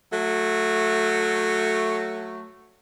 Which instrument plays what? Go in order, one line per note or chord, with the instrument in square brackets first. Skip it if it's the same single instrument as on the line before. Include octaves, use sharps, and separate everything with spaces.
[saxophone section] F#3 A3